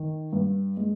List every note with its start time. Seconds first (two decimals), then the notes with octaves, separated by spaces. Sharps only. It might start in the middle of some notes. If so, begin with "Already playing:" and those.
Already playing: D#3
0.33 G2
0.77 G#3